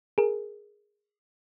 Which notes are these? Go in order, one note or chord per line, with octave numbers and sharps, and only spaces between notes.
G#4 A#4